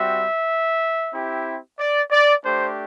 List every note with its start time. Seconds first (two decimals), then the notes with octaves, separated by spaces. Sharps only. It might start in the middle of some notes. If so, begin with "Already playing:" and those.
Already playing: G3 C4 F#4 E5
1.13 C4 E4 G4
1.79 D5
2.11 D5
2.44 A3 D4 G4 C5